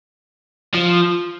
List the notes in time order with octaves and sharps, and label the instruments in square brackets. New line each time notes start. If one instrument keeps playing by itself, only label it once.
[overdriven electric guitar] F3